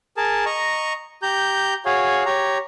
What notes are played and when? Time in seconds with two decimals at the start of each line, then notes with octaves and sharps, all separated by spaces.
0.17 G#4 A#4 A5
0.46 D#5 A#5 C#6
1.22 G4 A#5 G6
1.85 F#4 G#4 C#5 F5
2.26 G4 C#5 A#5